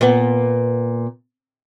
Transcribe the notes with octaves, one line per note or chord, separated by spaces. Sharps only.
A#2 B3